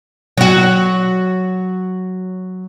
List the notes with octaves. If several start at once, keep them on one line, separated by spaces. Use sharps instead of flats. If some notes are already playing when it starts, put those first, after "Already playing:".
F#3 F#4